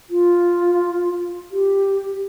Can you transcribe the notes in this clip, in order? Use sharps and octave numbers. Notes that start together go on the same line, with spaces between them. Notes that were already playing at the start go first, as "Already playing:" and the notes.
F4
G4